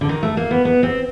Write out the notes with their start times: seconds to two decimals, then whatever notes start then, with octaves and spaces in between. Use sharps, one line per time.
0.01 D3
0.09 D#3
0.23 A3
0.37 A#3
0.51 B3
0.65 B3
0.83 C4